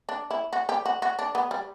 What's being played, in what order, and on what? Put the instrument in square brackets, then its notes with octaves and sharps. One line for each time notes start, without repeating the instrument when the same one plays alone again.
[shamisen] D4
E4
F#4
G4
F#4
F#4
D4
B3
G3